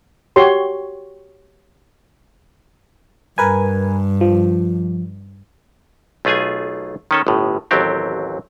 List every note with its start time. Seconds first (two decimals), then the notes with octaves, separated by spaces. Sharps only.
0.36 F#4 G4 C#5 C6
3.38 G2 A#4 B4 G#5
4.21 F3
6.25 B1 A3 F4 G#4 G#5
7.11 D#3 C#4 A4
7.27 G1 A2
7.71 A1 D#2 F#3 C4 G4